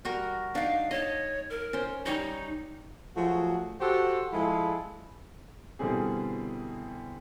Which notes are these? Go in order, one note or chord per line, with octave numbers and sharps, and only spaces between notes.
G3 F#4 A#4
D4 D#4 F5
C#5 D#5 A5
A#4
C#4 C5
G3 D#4 C#5 D#5
F3 F#3 A3 F#4 G#4
F#4 G4 A4 C5 F#5
F3 G#3 E4 F4 G#4 A4
B2 D3 E3 G3 C4 G#4